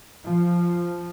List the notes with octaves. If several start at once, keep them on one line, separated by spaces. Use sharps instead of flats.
F3